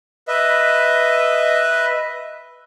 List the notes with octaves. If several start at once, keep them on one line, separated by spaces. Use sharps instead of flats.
B4 D#5 E5